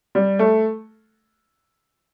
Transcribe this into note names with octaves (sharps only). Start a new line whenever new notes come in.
G3
A3